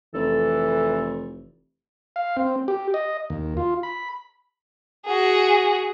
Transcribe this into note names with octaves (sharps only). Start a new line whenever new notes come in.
F1 E3 A4
F5
C4
G4
D#5
D#2
F4
B5
F#4 G#4